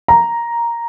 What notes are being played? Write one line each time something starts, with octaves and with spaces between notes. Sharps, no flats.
A#5